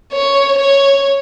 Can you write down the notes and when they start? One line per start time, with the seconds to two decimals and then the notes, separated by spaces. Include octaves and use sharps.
0.12 C#5
0.58 C#5